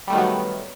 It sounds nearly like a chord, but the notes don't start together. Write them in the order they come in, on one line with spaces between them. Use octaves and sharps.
G3 A3 D#3 F#3 B3